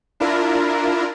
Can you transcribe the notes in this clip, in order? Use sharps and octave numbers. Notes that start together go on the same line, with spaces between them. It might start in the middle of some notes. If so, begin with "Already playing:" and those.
D4 E4 F4 A#4